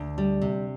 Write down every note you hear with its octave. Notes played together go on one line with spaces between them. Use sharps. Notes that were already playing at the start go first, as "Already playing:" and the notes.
Already playing: D2
G3
C3